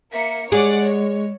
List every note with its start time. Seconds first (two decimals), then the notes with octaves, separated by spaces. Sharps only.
0.13 A#3 E5 C#7
0.52 G#3 G#4 C#5 D5 F#5
0.83 C#5